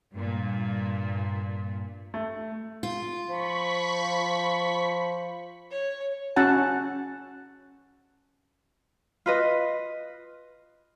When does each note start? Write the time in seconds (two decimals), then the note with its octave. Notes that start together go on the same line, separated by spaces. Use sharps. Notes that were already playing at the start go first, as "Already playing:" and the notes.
0.15 G2 A#2
2.14 A3
2.83 F4
3.29 F3 B5 C#6 B6
5.70 C#5
6.36 C#4 F#4 F#5 A5
9.26 F4 B4 D#5